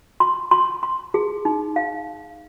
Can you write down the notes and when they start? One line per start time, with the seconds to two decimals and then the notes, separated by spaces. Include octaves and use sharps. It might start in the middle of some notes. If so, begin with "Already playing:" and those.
0.20 C6
0.51 C6
0.83 C6
1.14 G#4
1.45 D#4
1.76 F5